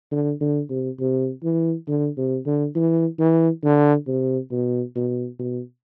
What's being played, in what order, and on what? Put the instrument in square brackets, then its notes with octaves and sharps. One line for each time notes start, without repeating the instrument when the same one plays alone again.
[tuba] D3
D3
C3
C3
E3
D3
C3
D3
E3
E3
D3
C3
B2
B2
B2